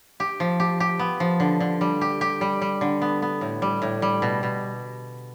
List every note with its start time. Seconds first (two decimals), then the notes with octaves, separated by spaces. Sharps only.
0.20 G4
0.40 F3
0.60 G4
0.80 G4
0.99 B3
1.20 F3
1.40 D3
1.60 D3
1.81 G3
2.01 G4
2.21 G4
2.41 G3
2.62 G3
2.81 D3
3.02 B3
3.22 B3
3.41 A2
3.62 G3
3.82 A2
4.02 G3
4.22 B2
4.43 B2